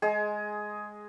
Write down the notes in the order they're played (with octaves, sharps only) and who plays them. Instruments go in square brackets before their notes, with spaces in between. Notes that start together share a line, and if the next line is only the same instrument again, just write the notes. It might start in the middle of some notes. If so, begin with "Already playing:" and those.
[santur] G#3 G#4